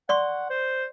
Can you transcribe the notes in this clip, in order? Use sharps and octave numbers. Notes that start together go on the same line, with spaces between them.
D5 F#5 C6 C#6
C5